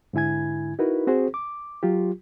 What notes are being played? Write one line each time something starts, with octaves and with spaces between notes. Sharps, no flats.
G#2 D3 E4 G#5 G#6
D#4 E4 F#4 A#4 B4
C4 F#4 G#4 C5
D6
F#3 F4 G4